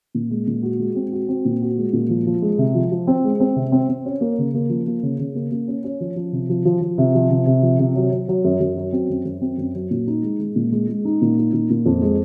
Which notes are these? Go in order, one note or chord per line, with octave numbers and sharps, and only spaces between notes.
A#2
G#3
A#2
F#4
G#3
C4
F#4
C4
A#2
F#4
G#3
A#2
F3
F3
G#3
C3
F3
F3
C4
G#3
C4
C3
C4
C4
C#4
A#3
C#3
A#3
F3
A#3
C#3
C#3
A#3
A#3
C#4
C#4
F3
F3
C3
F3
F3
F3
C3
F3
C3
C3
F3
C3
F#3
F#3
F#3
F#2
F#2
F#3
C4
F#2
F#2
C4
F#2
F#3
A#2
D#4
G#3
G#3
A#2
G#3
G#3
D#4
A#2
D#4
A#2
A#2
F2
G#3